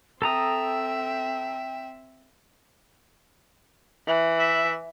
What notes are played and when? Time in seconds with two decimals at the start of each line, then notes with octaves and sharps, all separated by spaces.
0.22 C4 A4 E5 G5 A#5 D#6
4.07 E3
4.39 E5